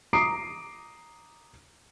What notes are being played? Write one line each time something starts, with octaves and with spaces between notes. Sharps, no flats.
A#5 D6 D#6 C7 D7